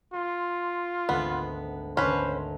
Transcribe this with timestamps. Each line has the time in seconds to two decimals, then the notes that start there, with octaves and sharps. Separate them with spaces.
0.14 F4 C6
1.09 G#1 D2 B3 F#5
1.97 G#1 D2 C#4 B4 C5